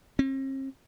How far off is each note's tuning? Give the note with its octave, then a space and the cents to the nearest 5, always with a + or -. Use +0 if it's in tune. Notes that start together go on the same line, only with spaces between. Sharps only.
C4 +45